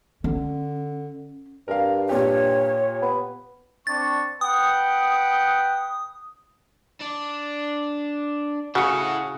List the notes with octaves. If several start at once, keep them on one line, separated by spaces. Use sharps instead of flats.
D3 C#4
G2 A#4 F5
A#2 G4 C#5
B3
C4 D4 C#6 A6
B4 F#5 G5 D#6
D4
C#3 E4 F#4 A4 C#7